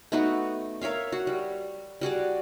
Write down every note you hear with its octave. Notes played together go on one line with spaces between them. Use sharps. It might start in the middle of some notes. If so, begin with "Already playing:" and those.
A3 B3 D#4 F#4
A#4 C#5 E5 F5
F#4
G3
G3 F#4 G#4 D5